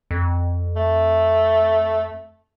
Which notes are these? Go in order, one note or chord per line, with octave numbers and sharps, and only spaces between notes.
F2
A3